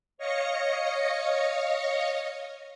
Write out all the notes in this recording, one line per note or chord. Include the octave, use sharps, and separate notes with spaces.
C#5 D#5 F5 A#6 C#7